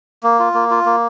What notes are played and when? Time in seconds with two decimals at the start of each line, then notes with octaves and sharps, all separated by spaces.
0.23 A#3
0.39 F4
0.54 A#3
0.71 F4
0.86 A#3